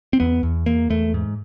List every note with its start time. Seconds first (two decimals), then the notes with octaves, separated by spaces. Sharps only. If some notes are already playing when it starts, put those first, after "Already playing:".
0.13 C4
0.20 E2 B3
0.43 E2
0.66 E2 A#3
0.90 E2 A3
1.14 G#2